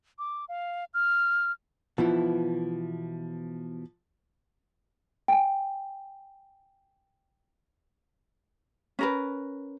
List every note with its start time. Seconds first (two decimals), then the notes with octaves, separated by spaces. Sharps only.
0.19 D6
0.49 F5
0.94 F6
1.98 B2 E3 F3 E4
5.28 G5 G#5
8.99 C#4 A#4 B4